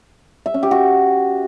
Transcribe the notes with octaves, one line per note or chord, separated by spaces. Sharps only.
E5
C#4
G4
F#4